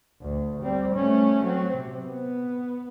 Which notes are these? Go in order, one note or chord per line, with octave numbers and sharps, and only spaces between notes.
D2
G3 C4
A3 C#4
F#3 C4
C3
B3